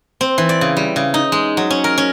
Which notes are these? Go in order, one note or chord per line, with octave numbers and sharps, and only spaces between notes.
C4
E3
D5
C#3
G3
C#3
D#4
G#3
F#3
C#4
A#4
C#4